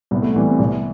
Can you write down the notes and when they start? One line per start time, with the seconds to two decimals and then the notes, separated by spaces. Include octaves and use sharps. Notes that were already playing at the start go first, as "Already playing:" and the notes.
0.11 C2 B3
0.22 A3
0.33 C3 E3 G3 B3
0.50 C4
0.59 C2 B3